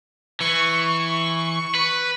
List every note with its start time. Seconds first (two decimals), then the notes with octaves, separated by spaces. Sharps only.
0.41 E3 C#6
1.75 B4